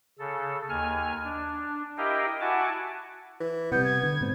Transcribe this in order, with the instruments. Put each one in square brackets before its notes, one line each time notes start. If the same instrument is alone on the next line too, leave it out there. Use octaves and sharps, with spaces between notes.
[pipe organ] C#3 A4
D#2 G#5 F6
D4
E4 G4 A#4 D#5 F5 G5
E4 F#4 F#5 G#5 A5 D6
[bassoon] E3
[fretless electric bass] C3 G3 [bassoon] B3 [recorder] G6
[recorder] G#6
[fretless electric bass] D3
G#2 B2 C4